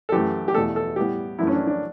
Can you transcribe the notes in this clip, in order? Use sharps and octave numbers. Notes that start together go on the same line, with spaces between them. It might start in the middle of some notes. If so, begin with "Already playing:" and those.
A4
F#2 E3 A3 G4
G4
E2 B2 A3 A4
A4
A2 G3 B3 G4
F#2 E3 A3 E4
C#4
D4
D4